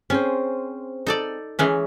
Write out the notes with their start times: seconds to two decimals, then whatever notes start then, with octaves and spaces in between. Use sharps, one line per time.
0.10 C4 C#4 G#4 C5
1.07 D#4 A4 D5
1.59 E3 G#3 C#4